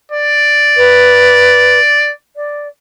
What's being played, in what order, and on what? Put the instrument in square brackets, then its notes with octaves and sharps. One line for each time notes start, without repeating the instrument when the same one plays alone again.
[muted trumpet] D5
[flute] B4
D5